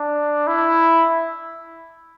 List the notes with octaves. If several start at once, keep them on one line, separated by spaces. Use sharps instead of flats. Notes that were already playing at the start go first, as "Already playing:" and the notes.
Already playing: D4
E4